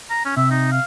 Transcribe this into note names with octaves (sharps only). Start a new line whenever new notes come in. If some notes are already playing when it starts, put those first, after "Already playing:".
A#5
C#4
C3 E5
D#4
F5